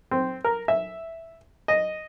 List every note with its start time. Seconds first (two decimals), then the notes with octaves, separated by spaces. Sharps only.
0.11 C4
0.44 A#4
0.68 E5
1.68 D#5